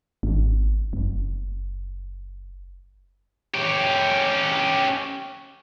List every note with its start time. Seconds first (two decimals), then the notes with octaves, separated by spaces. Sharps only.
0.23 G#1
0.93 F#1
3.54 C#4 G4